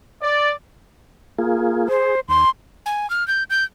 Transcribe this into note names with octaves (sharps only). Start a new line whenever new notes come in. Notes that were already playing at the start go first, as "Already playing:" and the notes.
D5
A#3 F4 G#4
G#4 C5
D#2 C6
G#5
F6
G6
G6